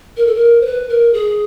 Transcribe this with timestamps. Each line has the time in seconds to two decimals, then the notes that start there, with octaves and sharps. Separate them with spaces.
0.17 A#4
0.27 A4
0.35 A#4
0.61 C5
0.66 B4
0.89 A#4
1.14 G#4